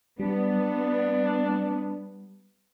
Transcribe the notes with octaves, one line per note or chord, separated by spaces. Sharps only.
G3 B3 D4